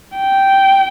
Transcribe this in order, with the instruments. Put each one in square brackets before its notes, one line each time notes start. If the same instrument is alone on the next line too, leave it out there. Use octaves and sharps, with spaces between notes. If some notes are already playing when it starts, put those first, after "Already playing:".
[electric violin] G5